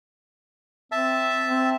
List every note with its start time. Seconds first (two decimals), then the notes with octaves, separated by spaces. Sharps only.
0.92 C4 E5 A5
1.48 C4